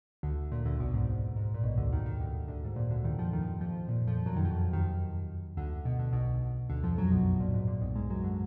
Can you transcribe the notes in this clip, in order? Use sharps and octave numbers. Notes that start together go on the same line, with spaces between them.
D2 D3
A#2
D2 D3
B1 B2
G#2
G#2
A#2
B1 B2
D2 D3
D#2 D#3
D#2 D#3
D2 D3
D2 D3
G#2
A#2
D2 D3
D#2 D#3
F2 F3
D#2 D#3
F2 F3
A#2
F2 F3
F#2 F#3
D#3
F2 F3
D#2 D#3
D2 D3
B2
D3
B1 B2
D2 D3
F2 F3
F#2 F#3
B1 B2
A#2
G#2
A#2
B1 B2
G#2 G#3
F#2 F#3
D3